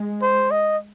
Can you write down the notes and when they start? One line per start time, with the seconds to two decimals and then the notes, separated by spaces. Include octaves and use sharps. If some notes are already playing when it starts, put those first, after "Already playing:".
Already playing: G#3
0.22 C5
0.51 D#5